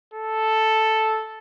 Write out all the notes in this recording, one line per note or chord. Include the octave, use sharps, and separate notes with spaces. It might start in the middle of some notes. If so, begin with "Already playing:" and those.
A4